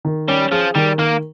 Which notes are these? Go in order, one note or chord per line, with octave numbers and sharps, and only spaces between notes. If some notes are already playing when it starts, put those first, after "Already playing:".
D#3
G3 C#4
F3 G#4
D#3 G3
D#3 A#3